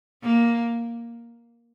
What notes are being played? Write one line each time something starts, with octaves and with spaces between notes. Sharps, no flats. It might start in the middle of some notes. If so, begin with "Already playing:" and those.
A#3